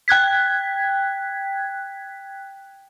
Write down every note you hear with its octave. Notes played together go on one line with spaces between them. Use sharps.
G5 F#6 G#6 B6